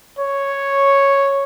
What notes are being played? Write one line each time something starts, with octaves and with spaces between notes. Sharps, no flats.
C#5